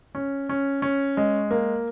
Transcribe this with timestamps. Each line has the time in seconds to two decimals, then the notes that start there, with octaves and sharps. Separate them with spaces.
0.15 C#4
0.49 C#4
0.82 C#4
1.17 G#3
1.51 A#3